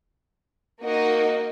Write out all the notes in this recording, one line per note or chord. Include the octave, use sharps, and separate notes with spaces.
A#3 D#4 F#4 A#4 D#5